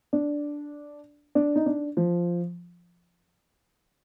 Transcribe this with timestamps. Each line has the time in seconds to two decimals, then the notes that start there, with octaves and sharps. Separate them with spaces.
0.13 D4
1.35 D4
1.56 D#4
1.66 D4
1.97 F3